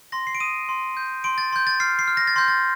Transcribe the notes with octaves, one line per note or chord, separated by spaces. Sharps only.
C6 A#6
C7
D7
D#6 D#7
C6
G6
C6 D7
A6
C6 G6
A6
F6 C7
C7
F6
A#6
A6
C6 G6
A6